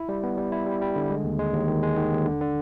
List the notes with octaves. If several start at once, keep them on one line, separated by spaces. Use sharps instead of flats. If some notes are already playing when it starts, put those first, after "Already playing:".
Already playing: E4
G3
B3
G3
E4
G3
G3
D3
G#3
D#2
G#3
D#2
D#3
G#3
D#3
D#2
D3
D3